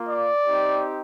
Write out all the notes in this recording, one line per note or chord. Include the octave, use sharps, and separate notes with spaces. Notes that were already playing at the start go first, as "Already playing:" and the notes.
Already playing: A#3 F4
D5
C4 D#4 G4